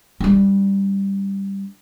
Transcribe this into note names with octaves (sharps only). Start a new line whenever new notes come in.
G3 D4